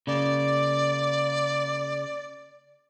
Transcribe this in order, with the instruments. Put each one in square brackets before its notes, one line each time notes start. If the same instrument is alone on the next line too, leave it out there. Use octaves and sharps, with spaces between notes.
[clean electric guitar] C#3 A#3 [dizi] D5